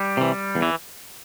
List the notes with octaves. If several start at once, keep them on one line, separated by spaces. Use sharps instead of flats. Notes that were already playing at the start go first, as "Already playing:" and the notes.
Already playing: G3
C3 E3
E2
E3